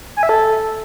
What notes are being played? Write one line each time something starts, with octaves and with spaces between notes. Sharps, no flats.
G#5
E5
A4